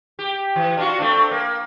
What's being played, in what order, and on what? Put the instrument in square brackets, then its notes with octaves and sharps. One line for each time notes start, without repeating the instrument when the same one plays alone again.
[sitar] G4
E3
D4 F4 F#4
A3 C4 D4
A#3